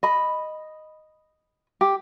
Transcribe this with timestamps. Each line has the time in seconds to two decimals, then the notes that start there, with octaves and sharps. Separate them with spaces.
0.03 D#5 B5
1.81 G4